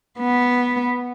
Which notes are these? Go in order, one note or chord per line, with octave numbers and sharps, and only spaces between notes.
B3